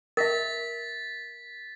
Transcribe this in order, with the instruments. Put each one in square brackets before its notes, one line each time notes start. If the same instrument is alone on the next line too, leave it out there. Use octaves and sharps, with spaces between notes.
[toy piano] A#4 E5 [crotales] A6 B6